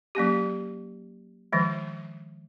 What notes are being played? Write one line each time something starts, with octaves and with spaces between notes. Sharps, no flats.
F#3 A#3 C#4 G4
D#3 F3 G#3